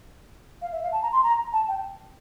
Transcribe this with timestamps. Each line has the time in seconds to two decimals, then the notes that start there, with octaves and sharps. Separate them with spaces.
0.62 F5
0.72 E5
0.82 F5
0.92 A5
1.02 A#5
1.12 C6
1.23 A#5
1.53 A5
1.68 G5